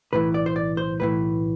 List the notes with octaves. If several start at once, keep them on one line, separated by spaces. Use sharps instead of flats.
B1 A2 E3 B4
D5
C5
D5
C5
B1 A2 E3 B4